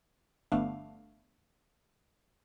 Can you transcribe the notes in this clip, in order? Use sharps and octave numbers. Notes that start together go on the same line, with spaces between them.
G1 A3 B3 D4 F5